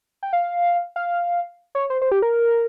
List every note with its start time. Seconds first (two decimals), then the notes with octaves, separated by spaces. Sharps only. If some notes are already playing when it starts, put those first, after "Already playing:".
0.23 G5
0.33 F5
0.96 F5
1.75 C#5
1.90 C5
2.02 C5
2.11 G4
2.22 A#4